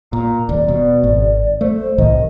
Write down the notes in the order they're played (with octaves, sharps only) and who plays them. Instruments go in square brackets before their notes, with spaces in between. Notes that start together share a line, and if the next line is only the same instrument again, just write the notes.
[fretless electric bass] A#2 [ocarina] A#5
[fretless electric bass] D#1 [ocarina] D5
[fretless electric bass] B2
G#1
[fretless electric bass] A3 [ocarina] C5
[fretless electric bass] C2 A2 D#3 [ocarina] D#5